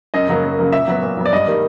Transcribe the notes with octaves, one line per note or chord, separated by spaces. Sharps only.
F#2 D#5
C#3 F#3 A#3
F#2
C#3 F#3 A#3
A#2 E5
F#3 B3
A#2
F#3 B3
D5
G2 D#5
D#3 G3 A#3